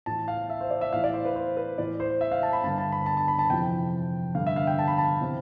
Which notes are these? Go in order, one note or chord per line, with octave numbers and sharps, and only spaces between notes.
A2 E3 A5
F5
E5
C5
D5
E5
A2 E3 F5
D5
C5
B4
C5
B4
A2 E3 D5
C5
E5
F5
A5
B5
G2 D3 A5
A5
B5
A5
A5
B5
A5
F2 C3 E3 G5
G2 D3 F5
E5
F5
G5
A5
B5
A5
C3 E3